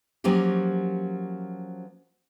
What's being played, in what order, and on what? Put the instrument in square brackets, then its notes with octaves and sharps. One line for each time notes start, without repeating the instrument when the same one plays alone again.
[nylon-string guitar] F3 F#3 A#3 C#4 G4